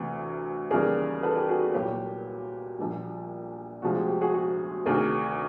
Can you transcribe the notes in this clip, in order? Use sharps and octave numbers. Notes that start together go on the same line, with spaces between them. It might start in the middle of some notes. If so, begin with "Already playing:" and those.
Already playing: D2 C3 E3
D#2 C#3 E3 G3 G#4 A#4
A4 B4
G4 A4
F#4 G#4
F#4
C2 A#2 F#3 G4
A#1 A#2 G3
D2 C3 F3 G#3 F#4
G4
G4
F#4 G#4
F#4 G#4
D2 C3 D#3 G#4 A#4